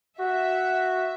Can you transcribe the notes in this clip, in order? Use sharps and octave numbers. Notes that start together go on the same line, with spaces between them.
F#4 E5